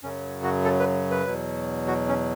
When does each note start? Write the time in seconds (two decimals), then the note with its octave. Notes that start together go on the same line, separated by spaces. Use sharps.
0.03 F#2 C#3 F#3 C#4
0.44 F#4
0.64 A4
0.80 B4
1.11 B4
1.26 E2 B2 F#3
1.88 F#4
2.08 C#4